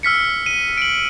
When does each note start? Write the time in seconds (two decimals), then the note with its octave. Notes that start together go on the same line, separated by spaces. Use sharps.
0.03 E6 F6 B6 C#7
0.46 D#7
0.78 D7 F#7